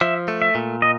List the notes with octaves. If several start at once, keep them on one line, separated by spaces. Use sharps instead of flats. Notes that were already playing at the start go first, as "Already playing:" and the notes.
F3 E5
A3
E5
A#2
D#5